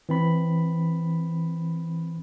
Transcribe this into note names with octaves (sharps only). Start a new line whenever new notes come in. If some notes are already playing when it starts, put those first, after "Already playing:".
E3 C4 B5